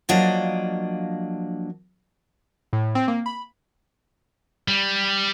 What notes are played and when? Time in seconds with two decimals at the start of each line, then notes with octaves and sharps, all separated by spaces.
0.09 F3 F#3 A#3 D4 D#5
2.73 A2
2.95 C4
3.08 A#3
3.26 B5
4.68 G3